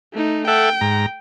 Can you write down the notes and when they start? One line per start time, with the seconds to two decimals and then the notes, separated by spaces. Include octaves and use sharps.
0.14 A3 D#4
0.48 A4 E5 F#5 G5
0.81 G#2 A#5